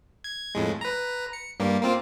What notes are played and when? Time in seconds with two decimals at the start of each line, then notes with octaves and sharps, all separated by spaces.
0.24 G#6
0.55 F2 A2 G#3
0.81 B4 A#5
1.33 C#7
1.60 G2 G3 A#3
1.83 A#3 C4 F4